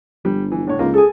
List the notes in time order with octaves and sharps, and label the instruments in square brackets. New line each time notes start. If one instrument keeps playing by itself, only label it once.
[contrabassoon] G1 [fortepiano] G3
[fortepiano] E3
A2 D3 C#5
[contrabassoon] C#2 [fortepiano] A#3 D#4 F4
[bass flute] G#4 [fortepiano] A4 G#5